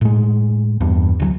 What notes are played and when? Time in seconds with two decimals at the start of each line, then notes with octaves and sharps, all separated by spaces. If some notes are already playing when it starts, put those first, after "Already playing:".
0.01 A2 G#3
0.80 E2 G2
1.20 D2 D3 F#3